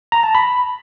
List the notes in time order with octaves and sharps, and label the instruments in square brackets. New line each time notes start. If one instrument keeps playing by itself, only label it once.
[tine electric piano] A#5
A5
B5